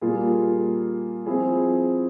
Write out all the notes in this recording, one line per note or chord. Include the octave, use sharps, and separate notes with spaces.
A#2 G3 A#3 F4 G#4
F3 C4 E4 G#4 C5